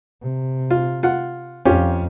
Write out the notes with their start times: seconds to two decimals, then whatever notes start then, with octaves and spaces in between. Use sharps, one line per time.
0.22 C3
0.71 F4
1.03 F4 F#5
1.65 F2 C#4 F4 G4